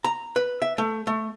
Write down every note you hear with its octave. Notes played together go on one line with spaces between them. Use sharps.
A#5
B4
E5
A3
A3